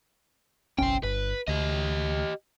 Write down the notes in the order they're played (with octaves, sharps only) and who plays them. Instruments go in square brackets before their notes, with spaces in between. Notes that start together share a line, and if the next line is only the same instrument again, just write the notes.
[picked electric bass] F#1 B1 C#4 [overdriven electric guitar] C5 G5
[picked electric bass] G1 [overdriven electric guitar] B4
[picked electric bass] D2 [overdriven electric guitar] G4 D#5